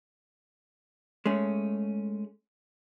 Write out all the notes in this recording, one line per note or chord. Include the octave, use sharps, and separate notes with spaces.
G#3 A3 C#4